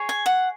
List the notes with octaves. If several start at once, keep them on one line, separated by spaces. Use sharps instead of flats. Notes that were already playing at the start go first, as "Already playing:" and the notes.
Already playing: G#4 C#5
G#5
F#5